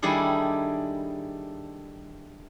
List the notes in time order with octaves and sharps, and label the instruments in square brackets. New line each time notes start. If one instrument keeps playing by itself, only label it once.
[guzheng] D#3 G3 D4 E4 G#4 A4